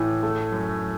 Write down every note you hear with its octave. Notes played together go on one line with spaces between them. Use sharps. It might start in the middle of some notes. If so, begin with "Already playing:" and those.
Already playing: A2 E3
A3
F#2